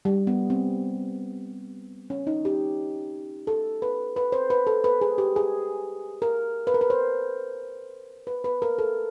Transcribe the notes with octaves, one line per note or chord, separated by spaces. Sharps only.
G3
B3
C4
C#4
D#4
G4
A4
B4
B4
C5
B4
A4
B4
G#4
G4
G#4
A#4
B4
A#4
B4
C5
B4
B4
A#4
A4